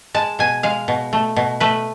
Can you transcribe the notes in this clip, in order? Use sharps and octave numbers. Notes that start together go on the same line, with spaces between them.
G#3 A5
B2 G#5
G#3 F5
B2
A3
B2
A3 B4